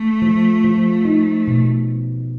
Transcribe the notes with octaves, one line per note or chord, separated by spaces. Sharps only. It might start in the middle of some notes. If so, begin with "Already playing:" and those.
Already playing: A3
F3
F3
D#4
B2